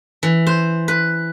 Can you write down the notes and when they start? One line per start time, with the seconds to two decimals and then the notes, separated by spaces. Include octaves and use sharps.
0.23 E3
0.47 C5
0.88 B4